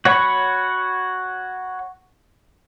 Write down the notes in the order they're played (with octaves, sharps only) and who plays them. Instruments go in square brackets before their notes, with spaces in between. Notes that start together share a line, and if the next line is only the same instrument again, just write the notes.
[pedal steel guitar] F#4 C#5 F#5 B5 C#6